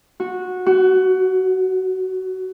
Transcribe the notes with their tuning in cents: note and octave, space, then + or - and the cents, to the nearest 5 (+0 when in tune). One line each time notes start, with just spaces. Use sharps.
F#4 -15
F#4 +20